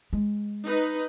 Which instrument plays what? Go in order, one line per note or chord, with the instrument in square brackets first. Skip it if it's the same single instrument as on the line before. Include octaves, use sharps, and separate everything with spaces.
[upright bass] G#3
[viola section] D#4 B4